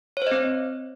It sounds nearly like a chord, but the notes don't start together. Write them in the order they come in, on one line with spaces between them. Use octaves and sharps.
C#5 C5 D#5 C4